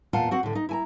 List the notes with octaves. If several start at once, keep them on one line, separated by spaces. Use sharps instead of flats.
E2 A#2 F4 F#5 A5
C4 F#4 F#5
A2 D3
D#4
E4 G#5 A#5